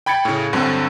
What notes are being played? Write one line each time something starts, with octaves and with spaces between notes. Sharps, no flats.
G5 B5 G#6 A6 C#7
A2 C#3
D2 G2 D3 F#3 C4